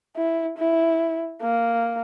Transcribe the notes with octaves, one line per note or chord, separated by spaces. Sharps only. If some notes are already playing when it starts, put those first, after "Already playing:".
E4
E4
A#3